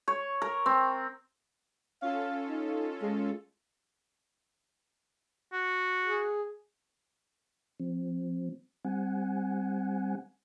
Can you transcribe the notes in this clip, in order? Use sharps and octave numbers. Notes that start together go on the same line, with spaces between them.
C#5
A#4
C4
C#4 F4 A4 F5
D#4
G#3
F#4
G#4
F3 C4
G3 C4 F#5 G#5